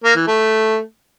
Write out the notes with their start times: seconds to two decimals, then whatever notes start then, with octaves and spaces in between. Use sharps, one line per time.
0.04 A#3
0.15 E3
0.27 A3